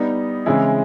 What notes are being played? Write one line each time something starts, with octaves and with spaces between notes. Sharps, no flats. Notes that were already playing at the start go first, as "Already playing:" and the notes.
Already playing: G3 B3 D#4
C#3 E3 G#3 C4 E4